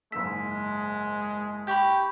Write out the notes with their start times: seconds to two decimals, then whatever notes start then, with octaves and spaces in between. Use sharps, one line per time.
0.12 F#1 G#2 G#3 E6 B6
1.67 G4 B5 C#6 G6